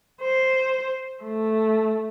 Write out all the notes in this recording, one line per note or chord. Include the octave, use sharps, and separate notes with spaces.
C5
A3